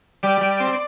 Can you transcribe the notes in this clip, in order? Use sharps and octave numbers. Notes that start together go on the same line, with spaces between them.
G3 D5
G3
C4